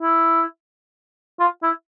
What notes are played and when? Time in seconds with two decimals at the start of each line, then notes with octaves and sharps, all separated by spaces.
0.01 E4
1.40 F4
1.63 E4